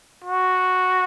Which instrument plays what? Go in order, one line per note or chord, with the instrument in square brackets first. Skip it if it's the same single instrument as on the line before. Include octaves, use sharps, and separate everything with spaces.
[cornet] F#4